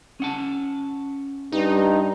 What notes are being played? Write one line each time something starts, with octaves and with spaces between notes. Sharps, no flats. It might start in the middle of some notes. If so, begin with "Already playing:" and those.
C#4 F#5 A5
G2 D#4